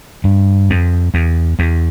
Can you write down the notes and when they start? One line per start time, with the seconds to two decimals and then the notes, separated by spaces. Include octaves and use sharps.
0.24 G2
0.70 F2
1.14 E2
1.59 E2